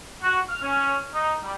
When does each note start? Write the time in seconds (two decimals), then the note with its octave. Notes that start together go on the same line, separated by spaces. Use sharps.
0.23 F#4
0.49 F6
0.62 C#4
1.14 D#4
1.43 G3